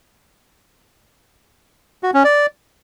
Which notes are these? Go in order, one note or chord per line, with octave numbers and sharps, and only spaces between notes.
F#4
C#4
D5